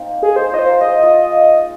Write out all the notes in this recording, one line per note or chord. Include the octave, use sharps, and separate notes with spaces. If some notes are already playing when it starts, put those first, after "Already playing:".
Already playing: A#3 C4 D#4 F4
G#4
D#4 C5
F4 D#5
C5
A#4
G#4 D#5
F4